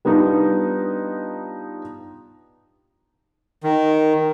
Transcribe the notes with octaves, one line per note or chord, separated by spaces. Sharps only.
G3 B3 D4 D#4 F4
D#3